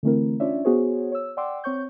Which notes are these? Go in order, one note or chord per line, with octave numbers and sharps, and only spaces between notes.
D3 E3 A3 C4 E4 A#4
C#4 D4 F4 C#5 D5 E5
B3 F#4 G#4 C5 C#5
C#5 E6
D5 F#5 G5 C6 D6 E6
C4 C#5 C#6 G6